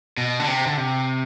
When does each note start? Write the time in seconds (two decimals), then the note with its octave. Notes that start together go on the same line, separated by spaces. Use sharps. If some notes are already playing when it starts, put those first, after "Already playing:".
0.17 B2
0.40 D3
0.48 C3
0.66 D3
0.77 C3